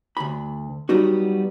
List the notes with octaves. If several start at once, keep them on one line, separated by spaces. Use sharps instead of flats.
D2 B5
F#3 G3 B3 D#4 F#4